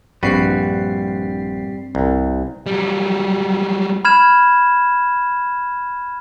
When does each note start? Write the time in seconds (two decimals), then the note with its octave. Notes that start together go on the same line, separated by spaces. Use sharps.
0.23 A#1 G2 G3 C4 F#4 B4 C7
1.95 C2
2.66 F#3 G3
4.05 B5 F6 G#6 E7